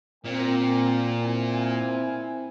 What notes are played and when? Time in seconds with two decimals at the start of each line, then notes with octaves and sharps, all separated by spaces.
0.25 A#2 A#3 C4 G5
1.23 C4 E4 G#5